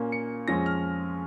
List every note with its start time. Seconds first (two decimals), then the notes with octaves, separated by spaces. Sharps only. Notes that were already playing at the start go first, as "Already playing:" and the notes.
Already playing: A#2 A#3 C#4
0.12 C#7
0.48 F2 F3 G#3 C#4 A#6
0.66 F6